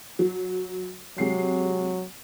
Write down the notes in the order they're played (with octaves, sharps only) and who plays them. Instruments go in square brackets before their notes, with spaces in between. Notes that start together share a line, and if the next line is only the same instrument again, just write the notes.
[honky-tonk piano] F#3
[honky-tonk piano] C3 G#3 C7 [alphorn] F#3